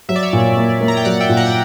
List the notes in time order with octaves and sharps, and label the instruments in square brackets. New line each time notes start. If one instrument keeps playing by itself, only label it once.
[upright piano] F#3 [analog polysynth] E5
[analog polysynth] D5
C#5 E5
[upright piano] A#2
A#3
A#3
[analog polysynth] A#5
G5
[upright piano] F#3 [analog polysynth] D5 F#5
[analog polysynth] E5 G5
[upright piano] A#2
[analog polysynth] F#5 A#5
G5